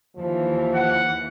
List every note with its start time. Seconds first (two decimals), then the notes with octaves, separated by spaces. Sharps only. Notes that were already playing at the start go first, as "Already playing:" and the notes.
0.17 D#2 E3 F3
0.75 F#5